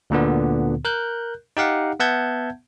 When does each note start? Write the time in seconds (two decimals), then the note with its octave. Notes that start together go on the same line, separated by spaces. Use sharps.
0.10 D2 A#2 D3 B3
0.85 A#4 F#6 G6
1.57 D#4 G4 F5 F#5
2.00 B3 E5 F#5 A5 G6 G#6